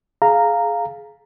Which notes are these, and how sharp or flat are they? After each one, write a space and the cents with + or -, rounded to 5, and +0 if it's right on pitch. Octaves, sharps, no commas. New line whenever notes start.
G#4 +20 F5 +0 A#5 -10